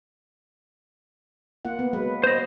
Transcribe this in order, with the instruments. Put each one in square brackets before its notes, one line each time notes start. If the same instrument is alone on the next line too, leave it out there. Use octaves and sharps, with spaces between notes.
[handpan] A#3 F4 F#5
B3
F#3 G#3 B4
[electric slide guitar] C5 D#5